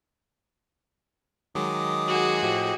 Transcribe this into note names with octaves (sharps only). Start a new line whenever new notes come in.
D#3 F#3 G#3 D6 D#6
F#4 G#4
A2 F3 G4 D#5